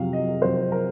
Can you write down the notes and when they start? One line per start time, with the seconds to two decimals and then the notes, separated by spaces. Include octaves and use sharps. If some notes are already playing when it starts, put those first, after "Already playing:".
Already playing: F2 C3 F#3 F5
0.13 D#5
0.42 F2 C3 F#3 C5
0.72 A#4